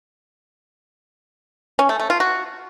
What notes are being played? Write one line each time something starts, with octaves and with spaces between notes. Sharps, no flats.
C#4
A3
A3
F4
F#4